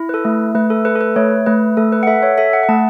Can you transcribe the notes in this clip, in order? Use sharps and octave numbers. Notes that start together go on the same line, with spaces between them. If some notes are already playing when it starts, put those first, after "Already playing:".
Already playing: E4
B4
A4
A3
A3 B4
A4
A4 B4
A4
B4
A3 C#5
A3 B4
A3 A4
B4
F#5
A4 E5
C#5
A4 E5
F#5
F#5
A3 A5